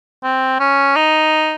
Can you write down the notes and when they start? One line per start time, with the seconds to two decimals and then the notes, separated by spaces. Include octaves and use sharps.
0.23 C4
0.60 C#4
0.96 D#4